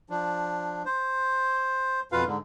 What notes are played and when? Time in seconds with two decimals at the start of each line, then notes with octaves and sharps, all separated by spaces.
0.10 F3 D4
0.85 C5
2.12 F2 B2 F4 B4 F5
2.26 G#2 D3